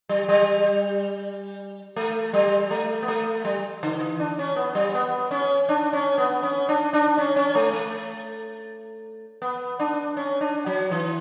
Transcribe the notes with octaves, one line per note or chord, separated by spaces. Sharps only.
G3
G3
A3
G3
A3
B3
A3
G3
D3
E3
D4
C#4
B3
G3
B3
C#4
D4
C#4
B3
C#4
D4
D4
C#4
C#4
A3
A3
B3
D4
C#4
D4
F#3
E3